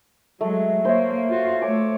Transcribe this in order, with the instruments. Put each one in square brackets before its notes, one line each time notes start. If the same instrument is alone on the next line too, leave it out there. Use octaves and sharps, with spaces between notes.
[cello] F#3 G#3 [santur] A3
[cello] A#3 [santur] C5 C#5 E5
[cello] F4 F#4
[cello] A3 C#5 [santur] D6